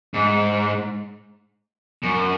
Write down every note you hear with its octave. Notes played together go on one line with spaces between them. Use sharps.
G#2
F#2